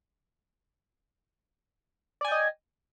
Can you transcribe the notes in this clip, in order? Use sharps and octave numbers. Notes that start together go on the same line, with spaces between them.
D5 D#5 G5 G#5